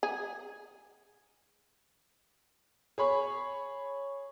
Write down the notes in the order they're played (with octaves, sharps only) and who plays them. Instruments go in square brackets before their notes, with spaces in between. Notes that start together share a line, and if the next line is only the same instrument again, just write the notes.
[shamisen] G#4
[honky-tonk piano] G#4 C#5 B5 C#6